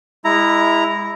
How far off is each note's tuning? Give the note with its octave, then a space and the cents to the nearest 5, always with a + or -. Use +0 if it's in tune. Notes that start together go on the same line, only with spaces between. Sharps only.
G#3 -25 E4 +0 A#5 +0